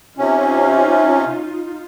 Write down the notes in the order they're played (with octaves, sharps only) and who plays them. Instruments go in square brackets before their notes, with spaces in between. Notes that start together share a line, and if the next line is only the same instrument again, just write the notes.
[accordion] C3 C#4 [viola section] D#4 F4